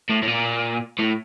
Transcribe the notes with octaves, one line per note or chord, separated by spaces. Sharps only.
A2
A2
A#2
A2